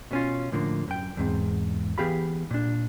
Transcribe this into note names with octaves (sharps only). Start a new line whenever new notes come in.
B2 C#4 F4
A2 D3 F3 A#3
F#2 G5
E2 G#2 C4
E3 B3 G4 G#4 F5 B5
A#2 D4